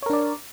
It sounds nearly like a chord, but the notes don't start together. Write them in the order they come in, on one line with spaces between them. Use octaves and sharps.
C#5 A#4 D4 D5